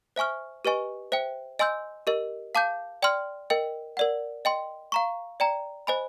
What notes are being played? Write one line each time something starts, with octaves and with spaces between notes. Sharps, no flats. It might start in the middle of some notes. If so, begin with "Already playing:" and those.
C5 E5 G#5 C#6 F6
G4 B4 D#5 G#5 C#6
C5 E5 G5
D#5 G#5 C6 E6 G6
G4 A#4 D#5
F5 A5 D6 G6
D5 G5 C6 F6
A#4 D#5 G5
A#4 D5 F#5
D#5 G5 C6
F5 A#5 C#6
D5 G5 A#5
C5 D#5 G#5 B5